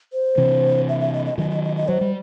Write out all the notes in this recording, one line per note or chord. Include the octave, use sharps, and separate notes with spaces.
C5
C3 E3
E5
E5
D#5
D#5
D#3 F#3 D#5
D#5
D#5
D#5
F#3 C5
G3